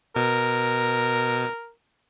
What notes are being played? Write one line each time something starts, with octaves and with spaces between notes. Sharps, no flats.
B2 A#4